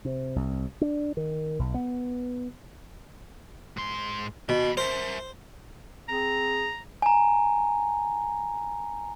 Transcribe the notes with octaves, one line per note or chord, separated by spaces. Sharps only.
C3
C2
D4
D#3
B1
B3
G#2 C6
D#2 B2 B5
A#4 C5 E5
C4 G#4 A#5
G#5 A#5